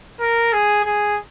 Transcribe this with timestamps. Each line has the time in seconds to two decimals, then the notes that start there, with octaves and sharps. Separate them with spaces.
0.20 A#4
0.53 G#4
0.84 G#4